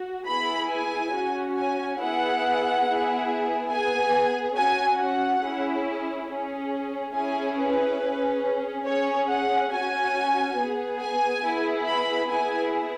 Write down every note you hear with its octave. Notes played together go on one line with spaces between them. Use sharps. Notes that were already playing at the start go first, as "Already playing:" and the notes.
Already playing: F#4
B3 E4 G#4 B5
G#5
C#4 F#4
G#5
B3 E4 G#4 F#5
B3 E4 G#4
B3 G#4 G#5
C#4 F#4 G#5
F#5
C#4 E4 G#4
C#4 G#4
C#4 E4 G#4 G#5
B4
C#4 G#4
C#4 G#4 C#5
F#5
C#4 F#4 G#5
B3 G#4
G#5
B3 E4 G#4
B5
B3 E4 G#4 G#5